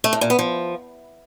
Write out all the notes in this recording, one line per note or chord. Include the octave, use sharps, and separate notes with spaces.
A3
A2
A#2
B3
F3